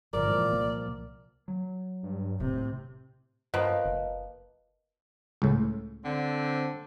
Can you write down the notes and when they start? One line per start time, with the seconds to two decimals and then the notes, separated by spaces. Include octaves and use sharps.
0.13 G1 A#2 F3 A#4 D5
0.26 G#2 E3
0.53 C2 A#3
1.48 F#3
2.03 G2
2.40 D#1 A2 C3
3.54 G2 F3 A#3 B3 D#5
3.85 F#1
5.42 C#2 A2
6.04 D3 C4